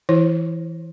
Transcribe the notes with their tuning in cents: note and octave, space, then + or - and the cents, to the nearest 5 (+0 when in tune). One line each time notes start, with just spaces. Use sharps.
E3 +5 E4 +0 C5 +0